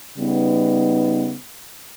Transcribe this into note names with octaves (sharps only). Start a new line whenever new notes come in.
C#3 G3 B3 D#4